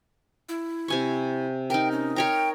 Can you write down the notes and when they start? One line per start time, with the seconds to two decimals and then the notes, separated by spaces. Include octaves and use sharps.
0.49 E4
0.88 C3 G#5 C#6
1.70 D#4 A#4 G5
1.92 C#4
2.16 A#4 C#5 G5 A#5